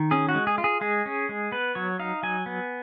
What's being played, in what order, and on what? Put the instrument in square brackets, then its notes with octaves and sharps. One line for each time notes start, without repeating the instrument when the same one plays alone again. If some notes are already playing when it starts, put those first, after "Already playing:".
Already playing: [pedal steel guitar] D#3
C#4 G#4
F#4
G#3
G#4
F4
G#4
G#3 G#4
C#4
G#3
B3 B4
F#3 C#5
D#4 F5
F#3 G#5
B3